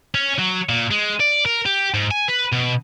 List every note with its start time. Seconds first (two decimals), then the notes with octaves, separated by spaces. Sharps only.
0.14 C#4
0.39 F#3
0.69 A#2
0.91 G#3
1.20 D5
1.46 A#4
1.66 G4
1.94 G#2
2.11 G#5
2.28 B4
2.53 B2